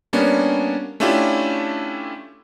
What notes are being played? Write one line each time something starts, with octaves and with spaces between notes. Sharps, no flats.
G3 A#3 B3 C#4 D4
A3 C#4 D4 E4 F4 G4